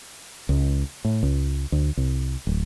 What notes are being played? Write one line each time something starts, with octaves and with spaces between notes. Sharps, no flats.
C#2
A2
C#2
D2
C2
D1